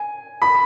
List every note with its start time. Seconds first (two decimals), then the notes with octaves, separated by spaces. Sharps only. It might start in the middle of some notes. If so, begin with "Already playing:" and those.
Already playing: G#5
0.42 B5